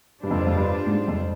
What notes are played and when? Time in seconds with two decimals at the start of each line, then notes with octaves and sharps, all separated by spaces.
0.23 G2 G3 D4 F4 C5
0.31 F2
0.47 F2
0.55 G2
0.87 G#2
1.08 F2